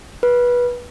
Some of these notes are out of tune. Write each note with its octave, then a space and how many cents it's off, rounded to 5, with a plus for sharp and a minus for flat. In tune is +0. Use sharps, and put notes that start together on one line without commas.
B4 -20